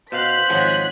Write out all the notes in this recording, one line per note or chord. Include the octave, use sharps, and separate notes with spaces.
B2 C5 F5 F#6 B6
G#1 F3 G#4 C#5 D#5 F#5